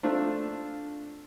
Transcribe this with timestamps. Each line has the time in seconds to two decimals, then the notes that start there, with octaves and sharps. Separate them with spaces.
0.03 A3 C4 D4 F4